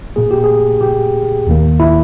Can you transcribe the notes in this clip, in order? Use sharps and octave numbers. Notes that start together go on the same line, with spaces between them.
A#2 A#3 G#4
G4
G#4
G4
D#2 D#3 A#3
E4